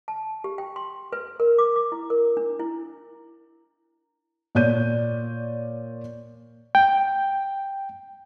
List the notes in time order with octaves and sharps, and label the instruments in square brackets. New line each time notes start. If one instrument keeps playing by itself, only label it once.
[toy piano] A5
G4
G5
C6
B4
A#4
D6
D6
E4
A#4
D4
E4
[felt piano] A#2 C#5 D5 G6 D#7
[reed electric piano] G5